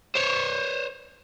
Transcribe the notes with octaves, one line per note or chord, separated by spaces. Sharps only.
C5 C#5